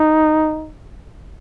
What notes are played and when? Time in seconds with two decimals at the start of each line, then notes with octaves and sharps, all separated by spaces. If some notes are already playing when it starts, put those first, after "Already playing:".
Already playing: D#4